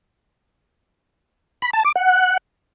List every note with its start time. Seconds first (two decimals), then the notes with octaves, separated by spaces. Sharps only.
1.62 B5
1.73 A5
1.84 D6
1.96 F#5